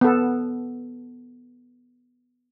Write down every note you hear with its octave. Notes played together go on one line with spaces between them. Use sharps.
B3 A4